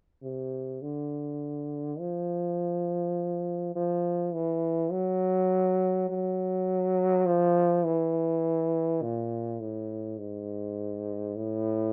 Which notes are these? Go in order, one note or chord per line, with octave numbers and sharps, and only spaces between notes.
C3
D3
F3
F3
E3
F#3
F#3
F3
E3
A#2
A2
G#2
A2